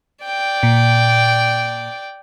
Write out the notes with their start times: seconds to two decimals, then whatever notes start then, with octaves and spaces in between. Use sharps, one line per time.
0.25 D5 G5
0.63 A#2